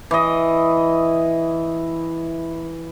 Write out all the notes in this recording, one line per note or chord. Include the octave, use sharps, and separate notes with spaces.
E3 D#5